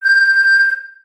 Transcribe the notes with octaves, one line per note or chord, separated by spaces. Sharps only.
G6